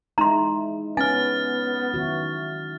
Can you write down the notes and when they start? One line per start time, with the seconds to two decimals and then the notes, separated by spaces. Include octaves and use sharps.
0.18 G#3 D#4 E4 A#5 C6
0.97 B3 C#4 G#5 F6 A6
1.94 D#3 E4 F#4